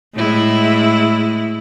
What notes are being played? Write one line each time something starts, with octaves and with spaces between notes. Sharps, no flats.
A2 G#3 E4